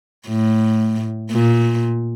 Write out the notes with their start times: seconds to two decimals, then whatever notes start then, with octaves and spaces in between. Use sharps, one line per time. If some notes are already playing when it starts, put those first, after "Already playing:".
0.28 A2
1.31 A#2